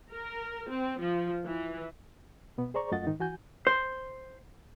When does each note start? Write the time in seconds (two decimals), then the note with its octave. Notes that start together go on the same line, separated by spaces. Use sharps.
0.12 A#4
0.69 C4
1.01 F3
1.46 E3
2.58 B2 B3
2.74 G#4 C5 D5 A#5 C#6
2.92 F#2 A3 F4 D#5 F#5 A6
3.07 G#2 D#3 D#4
3.20 E3 F#4 G#5 G6
3.67 C5